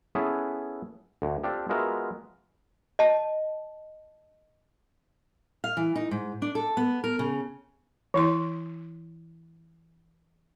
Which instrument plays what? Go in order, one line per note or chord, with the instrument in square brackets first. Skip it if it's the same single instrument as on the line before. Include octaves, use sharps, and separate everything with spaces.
[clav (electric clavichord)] B3 C#4 E4 G#4 A4 B4
D2
C4 D4 F4 G4 A4
G#3 B3 F4 F#4 A#4 E5
[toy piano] D#5 A5
[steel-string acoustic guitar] F5
E3
D#4
G#2
D4
A4
B3
A#4
C#3
[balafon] E3 E4 C6